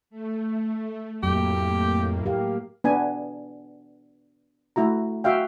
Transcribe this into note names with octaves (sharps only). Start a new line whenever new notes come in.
A3
F2 A2 F#3 A#3 G4
G4 A#4 F5
B3 D4 G#5
A3 E4 F#4 A#5
F#4 E5 F5 G5